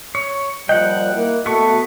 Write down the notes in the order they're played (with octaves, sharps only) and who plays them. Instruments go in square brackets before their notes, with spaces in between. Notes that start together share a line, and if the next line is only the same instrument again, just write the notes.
[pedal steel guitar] C#5
[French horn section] D#2 F3 G3 [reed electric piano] D#5 [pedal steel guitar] F#5 G5
[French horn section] A#3 E4
[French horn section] A3 F#4 [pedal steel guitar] B3 C#6